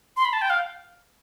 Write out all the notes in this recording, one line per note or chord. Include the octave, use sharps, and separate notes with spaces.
C6
B5
A5
G5
F5